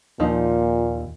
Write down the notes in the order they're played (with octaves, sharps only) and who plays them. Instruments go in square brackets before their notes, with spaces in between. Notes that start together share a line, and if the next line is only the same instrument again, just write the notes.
[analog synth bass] D#2 [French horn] A#2 [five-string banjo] F3 D#4